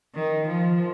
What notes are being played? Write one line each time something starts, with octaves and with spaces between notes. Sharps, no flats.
D#3
F3